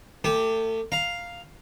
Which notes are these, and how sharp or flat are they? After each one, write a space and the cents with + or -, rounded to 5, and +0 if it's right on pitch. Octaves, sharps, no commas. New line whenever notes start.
A3 +30 G4 +0 A5 -35
F5 +0 A#5 +0